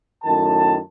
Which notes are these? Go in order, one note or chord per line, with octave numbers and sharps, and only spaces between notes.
F#2 A2 D#3 A5